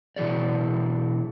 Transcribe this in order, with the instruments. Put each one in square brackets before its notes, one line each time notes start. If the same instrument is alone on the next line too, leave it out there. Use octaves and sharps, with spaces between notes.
[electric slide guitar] B2 E3 F#3 G#4 D5